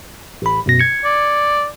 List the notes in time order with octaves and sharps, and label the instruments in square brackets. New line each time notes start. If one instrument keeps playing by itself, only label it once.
[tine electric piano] A1 B5
F#2 B2 A#6
G#6 C#7
[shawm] D5